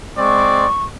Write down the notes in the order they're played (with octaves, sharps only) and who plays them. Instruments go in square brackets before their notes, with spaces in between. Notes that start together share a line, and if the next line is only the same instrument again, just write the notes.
[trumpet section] G#3 C4 D5 [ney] C#6